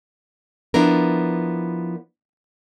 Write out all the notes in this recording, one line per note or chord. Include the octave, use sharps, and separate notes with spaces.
F3 B3 D4 E4 A#4